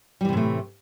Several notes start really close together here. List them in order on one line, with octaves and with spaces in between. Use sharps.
G3 E3 C3 A2 A3